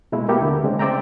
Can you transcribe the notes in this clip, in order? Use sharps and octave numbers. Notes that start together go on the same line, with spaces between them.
B2 G#3 A3 E4
A#3 B3 E4 G4 A4 A#4
D2 D3
C#3 G#3 A3 C4
C5 D5 E5 G5 A#5